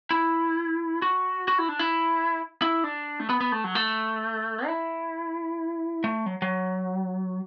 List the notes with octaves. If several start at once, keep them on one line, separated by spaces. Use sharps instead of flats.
E4
F#4
F#4
E4
D4
E4
E4
D4
A3
B3
B3
A3
F#3
A3
E4
A3
F#3
F#3